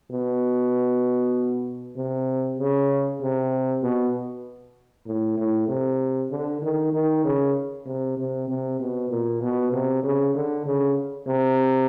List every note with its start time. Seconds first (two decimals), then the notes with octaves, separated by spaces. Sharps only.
0.11 B2
1.97 C3
2.59 C#3
3.21 C3
3.83 B2
5.07 A2
5.38 A2
5.68 C3
6.31 D3
6.62 D#3
6.93 D#3
7.24 C#3
7.86 C3
8.18 C3
8.48 C3
8.80 B2
9.10 A#2
9.41 B2
9.72 C3
10.04 C#3
10.35 D3
10.66 C#3
11.28 C3